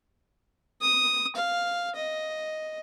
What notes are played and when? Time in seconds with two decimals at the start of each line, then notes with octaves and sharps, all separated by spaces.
0.81 D#6
1.36 F5
1.96 D#5